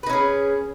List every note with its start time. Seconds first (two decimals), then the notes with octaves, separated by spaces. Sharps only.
0.03 B4
0.06 D#4
0.10 C#4
0.13 G#4